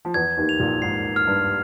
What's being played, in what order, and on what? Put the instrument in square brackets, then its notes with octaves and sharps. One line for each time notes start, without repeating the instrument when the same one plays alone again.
[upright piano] F3
[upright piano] E2 E3 [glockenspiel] G#6
[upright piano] D#2 D#3
[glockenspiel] F7
[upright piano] A#1 A#2
[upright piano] G#2 [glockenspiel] C7
[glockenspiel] F6
[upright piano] G2